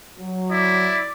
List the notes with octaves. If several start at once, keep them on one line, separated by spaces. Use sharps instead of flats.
F#3
E4 D5